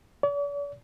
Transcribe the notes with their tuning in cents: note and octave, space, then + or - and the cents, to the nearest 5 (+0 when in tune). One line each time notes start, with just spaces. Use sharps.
D5 -45